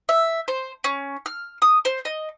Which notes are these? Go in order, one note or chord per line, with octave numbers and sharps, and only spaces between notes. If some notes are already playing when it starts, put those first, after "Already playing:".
E5
C5
C#4
F6
D#6
C5
D#5